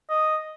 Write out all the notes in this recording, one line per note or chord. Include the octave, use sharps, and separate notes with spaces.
D#5